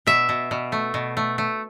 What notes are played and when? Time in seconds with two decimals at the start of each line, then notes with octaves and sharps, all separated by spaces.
0.07 B2 E5
0.29 B2
0.51 B2
0.72 A3
0.94 B2
1.17 A3
1.38 A3